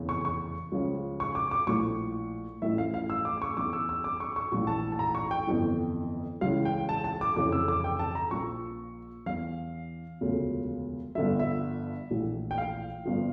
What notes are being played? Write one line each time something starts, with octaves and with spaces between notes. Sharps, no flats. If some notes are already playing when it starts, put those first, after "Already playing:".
Already playing: F1 E2 C#3 E3
C#6
C#6
C#2 C#3 F3
C#6
D6
D6
A#1 A2 F3 C#6
A1 A2 F3 E5
F5
F5
E6
D6
C#6
E2 E3 D6
E6
E6
D6
C#6
C#6
A#1 A2 E3 C#6
A5
A5
A#5
C#6
G5
G1 F2 E3
C#2 C#3 E3 F5
G5
A5
A5
D6
F1 F2 C#3 E3 D6
E6
D6
G5
A5
A#5
A#1 A#2 F3 C#6
E2 E3 F5
E1 D2 C#3 F3
G1 G2 D3 F3 E5
E5
A#1 A2 E3
G5
F5
G1 G2 F3